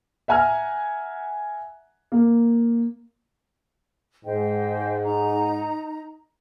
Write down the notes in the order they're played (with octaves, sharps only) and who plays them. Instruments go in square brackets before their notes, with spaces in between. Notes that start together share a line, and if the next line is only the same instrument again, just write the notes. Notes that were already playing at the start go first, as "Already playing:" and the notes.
[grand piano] E5 F#5 G#5 A#5 F6
A#3
[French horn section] G#2 [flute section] C5 D#5 G5
[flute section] D#4 A#5